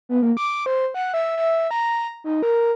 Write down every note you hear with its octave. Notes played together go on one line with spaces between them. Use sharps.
B3
A#3
D6
C5
F#5
E5
E5
A#5
D#4
A#4